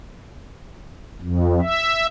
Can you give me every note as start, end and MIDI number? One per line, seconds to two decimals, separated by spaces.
1.21 1.60 41
1.61 2.07 76